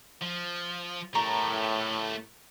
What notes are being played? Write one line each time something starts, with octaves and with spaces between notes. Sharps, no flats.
F3
A2 A3 G4 A#4 A#5 C#6